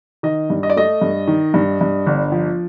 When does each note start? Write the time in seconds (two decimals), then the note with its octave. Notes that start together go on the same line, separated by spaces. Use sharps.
0.23 D#3 D#5
0.50 G2
0.63 D#5
0.70 D5
0.76 A3 D#5
1.01 G2
1.28 D#3
1.54 G2
1.81 G2
2.07 G1
2.32 F3